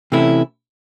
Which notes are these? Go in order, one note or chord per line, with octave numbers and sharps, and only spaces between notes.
C3 E3 A3 C#4 E4